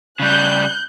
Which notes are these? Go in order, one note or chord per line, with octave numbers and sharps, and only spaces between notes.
C#3 G3 F#6 G6